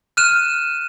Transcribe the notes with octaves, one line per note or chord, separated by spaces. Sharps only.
F6 F#6 D#7 E7